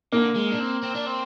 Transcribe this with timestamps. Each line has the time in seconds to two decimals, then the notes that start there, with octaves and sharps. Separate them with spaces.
0.12 D3 A#3
0.35 G#3
0.51 D4
0.59 C4
0.82 C4
0.95 D4
1.06 C4